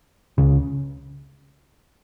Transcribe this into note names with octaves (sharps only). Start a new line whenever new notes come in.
C#2 C#3